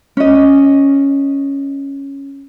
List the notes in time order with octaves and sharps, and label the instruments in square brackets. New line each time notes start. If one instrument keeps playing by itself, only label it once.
[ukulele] C#4 D#5